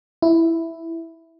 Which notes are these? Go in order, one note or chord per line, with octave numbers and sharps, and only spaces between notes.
E4